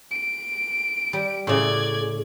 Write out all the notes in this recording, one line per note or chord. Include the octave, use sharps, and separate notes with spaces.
D7
G3
A2 C#3 D5 G#6